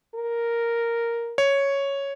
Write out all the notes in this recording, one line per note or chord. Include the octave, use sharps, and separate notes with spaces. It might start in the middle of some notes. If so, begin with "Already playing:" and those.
A#4
C#5